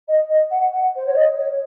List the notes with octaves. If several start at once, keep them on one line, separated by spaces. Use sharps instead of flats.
D#5
D#5
F#5
F#5
C5
C#5
D#5
C#5